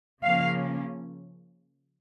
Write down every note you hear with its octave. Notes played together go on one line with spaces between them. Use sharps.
C#3 F3 A#3 C#4 F5